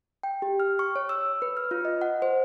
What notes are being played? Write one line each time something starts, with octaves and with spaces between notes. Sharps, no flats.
G5
G4
F6
C#6
C#5
E6
B4
F6
F4
D#5
F#5
C5